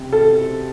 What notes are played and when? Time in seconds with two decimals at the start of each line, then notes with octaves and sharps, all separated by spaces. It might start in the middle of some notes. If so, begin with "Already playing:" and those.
Already playing: C3
0.13 A4